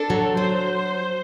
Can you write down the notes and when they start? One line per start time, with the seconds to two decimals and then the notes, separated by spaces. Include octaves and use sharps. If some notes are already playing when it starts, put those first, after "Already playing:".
Already playing: D4 A4
0.10 F#3
0.36 F#3 C5